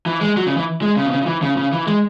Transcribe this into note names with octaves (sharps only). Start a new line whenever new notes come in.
E3
G#3
F#3
C#3
E3
G#3
C#3
B2
C#3
C#3
E3
C#3
C#3
E3
G#3